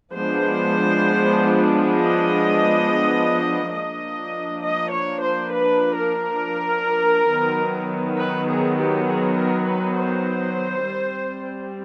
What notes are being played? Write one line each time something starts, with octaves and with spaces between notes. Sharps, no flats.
F3 G#3 B3 D4 C5
D#5
F3 A#3 D4 D#5
D#5
C#5
C5
B4
A#4
D#3 F#3 B3
B4
G#4
G4
G#4
A#4
B4
C5
G3 C4